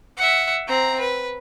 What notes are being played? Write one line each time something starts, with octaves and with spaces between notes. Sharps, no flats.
E5 F#5
C4 A#5
B4